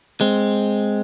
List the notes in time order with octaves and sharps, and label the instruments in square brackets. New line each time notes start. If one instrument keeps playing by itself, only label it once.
[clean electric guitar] G#3 C4